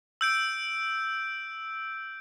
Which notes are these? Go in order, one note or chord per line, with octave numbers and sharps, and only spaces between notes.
E6 G6 D7